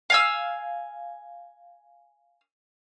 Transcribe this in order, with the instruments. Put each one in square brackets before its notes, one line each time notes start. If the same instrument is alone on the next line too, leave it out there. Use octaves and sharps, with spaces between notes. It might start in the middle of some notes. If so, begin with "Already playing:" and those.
[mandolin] F5 G#5 E6